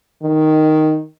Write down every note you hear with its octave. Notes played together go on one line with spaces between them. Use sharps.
D#3